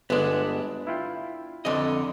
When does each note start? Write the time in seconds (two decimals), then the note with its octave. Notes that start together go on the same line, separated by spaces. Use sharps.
0.10 G1 G#3 B3 D4 G#4
0.87 E4 F4 G5
1.65 F2 D3 D#5